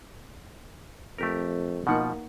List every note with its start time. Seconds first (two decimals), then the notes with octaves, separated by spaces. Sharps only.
1.18 F2 A3 G4 A#4
1.87 B2 F3 A#3 D#4 F#5